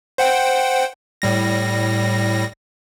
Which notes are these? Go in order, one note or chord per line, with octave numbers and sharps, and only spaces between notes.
C5 F#5 G5
A2 G3 A#6